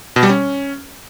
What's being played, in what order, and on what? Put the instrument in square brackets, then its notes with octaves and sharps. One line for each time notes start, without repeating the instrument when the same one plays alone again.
[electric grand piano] B2
G3
C#4